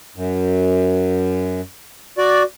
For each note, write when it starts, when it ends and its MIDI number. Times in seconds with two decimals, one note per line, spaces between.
0.16 1.61 42
2.18 2.43 66
2.18 2.43 74